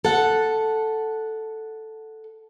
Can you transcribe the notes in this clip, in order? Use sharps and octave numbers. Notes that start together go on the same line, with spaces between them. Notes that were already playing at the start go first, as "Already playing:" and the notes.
A4 F#5